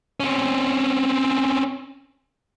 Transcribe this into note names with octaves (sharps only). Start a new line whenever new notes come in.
C4 C#4